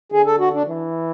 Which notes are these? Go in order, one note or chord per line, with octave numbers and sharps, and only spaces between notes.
D3 G#4
A4
F#4
D4
E3